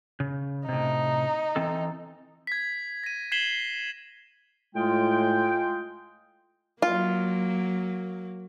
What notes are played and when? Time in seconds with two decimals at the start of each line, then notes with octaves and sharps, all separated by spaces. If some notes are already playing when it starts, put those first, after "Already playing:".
0.20 C#3
0.69 A2 C3 D#4
1.56 E3 C4 A4
2.47 G#6 B6
3.04 A#6 D#7
3.32 G#6 B6 C7 E7 F#7 G7
4.75 A2 G#3 F4 G5
6.82 F#3 A#3 F4